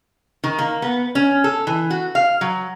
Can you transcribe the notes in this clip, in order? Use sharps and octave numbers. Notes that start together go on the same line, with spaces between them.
D#3
A#3
B3
C#4
A4
E3
F#4
F5
F#3